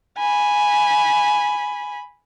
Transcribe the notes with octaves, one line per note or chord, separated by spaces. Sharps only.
G#5 B5